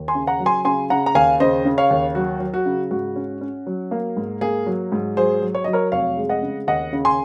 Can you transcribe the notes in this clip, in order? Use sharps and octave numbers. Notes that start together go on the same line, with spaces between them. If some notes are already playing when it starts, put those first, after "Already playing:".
Already playing: D#2
G#5 C6
C#3
F#5 A#5
F#3
G#5 C6
C#3 G#5 C6
C#3 F#5 A#5
A#5
D#2 F5 G#5
C#3 C5 D#5
C#3
C#5 F5
D#2
F#3 F#4
F#3
F#4
C#3
G#2 F#4
C#4
C#4
F#3
A#3
G#2
A#3 G#4
F#3
G#2
F#3 G#4 C5
F#3
C#5
F#3 D#5
A#4 C#5
F1 C#5 F5
G#3
D#5 F#5
C#3
D#2 D#5 F#5
C#3
G#5 C6